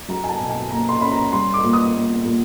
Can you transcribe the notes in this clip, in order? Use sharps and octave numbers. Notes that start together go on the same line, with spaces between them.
F#3 A#5
G#5
A5
B2
G#5
A#3 A#5
C6
C#4 B5
A#5
G3 C6
D6
A#2
D#6
B3
A#2